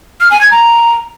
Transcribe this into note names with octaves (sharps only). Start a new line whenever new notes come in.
F6
G#5
G#6
A#5